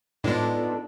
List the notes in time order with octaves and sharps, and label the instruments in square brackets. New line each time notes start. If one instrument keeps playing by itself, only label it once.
[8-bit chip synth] A2 G#3 [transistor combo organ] B3 D#4 A4 [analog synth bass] D4 [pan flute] F4